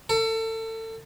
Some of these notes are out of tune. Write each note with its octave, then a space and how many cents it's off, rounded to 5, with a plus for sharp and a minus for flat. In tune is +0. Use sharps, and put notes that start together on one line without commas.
A4 +30